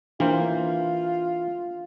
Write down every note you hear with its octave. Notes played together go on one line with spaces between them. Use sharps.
E3 A#3 D4 F4 B4 C5